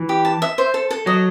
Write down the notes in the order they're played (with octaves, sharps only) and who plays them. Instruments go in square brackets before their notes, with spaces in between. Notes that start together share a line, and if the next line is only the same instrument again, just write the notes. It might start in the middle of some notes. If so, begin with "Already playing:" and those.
Already playing: [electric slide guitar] E3
[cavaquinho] G4
A5
E5
C5
A4
A4
[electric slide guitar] F#3 [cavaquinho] D#5